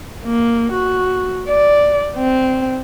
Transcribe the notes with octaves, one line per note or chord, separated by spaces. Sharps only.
A#3
F#4
D5
C4